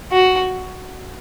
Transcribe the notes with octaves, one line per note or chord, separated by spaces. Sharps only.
F#4